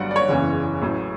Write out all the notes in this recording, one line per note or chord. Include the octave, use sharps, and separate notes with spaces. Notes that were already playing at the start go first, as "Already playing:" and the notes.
Already playing: G1 G2 F#3 D5 F#5
D5
C#5
F#1 E2 C#3 E3
A1 A2 F#3